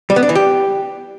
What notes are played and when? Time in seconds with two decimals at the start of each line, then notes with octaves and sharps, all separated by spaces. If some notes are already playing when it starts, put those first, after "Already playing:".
0.10 G3
0.16 B3
0.23 D4
0.29 E3
0.35 G4